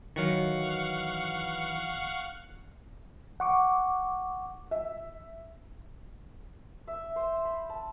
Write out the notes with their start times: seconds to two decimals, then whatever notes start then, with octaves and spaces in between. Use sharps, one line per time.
0.16 D#3 E3 F#3 F5 F#5 C#6
3.40 F#5 C#6 D6
4.71 E5
6.88 E5
7.16 C5
7.45 B5
7.69 A5